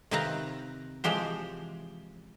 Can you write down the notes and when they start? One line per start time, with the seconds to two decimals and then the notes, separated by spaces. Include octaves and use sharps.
0.11 C3 D#3 C4 B4 F5 A#5
1.04 E3 F3 G#3 G4 C5